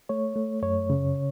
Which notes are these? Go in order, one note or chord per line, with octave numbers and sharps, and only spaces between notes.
A3 C#5
A3
F#2 C#5
C#3